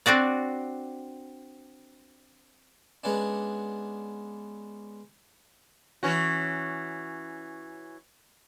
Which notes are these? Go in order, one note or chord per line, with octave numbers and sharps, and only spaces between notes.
C4 D4 F#4 D5
G#3 B3 C#4 D4
E3 C#4 F#4